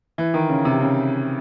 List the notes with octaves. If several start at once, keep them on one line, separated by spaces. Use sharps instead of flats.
E3
D#3
C#3
C3
C#3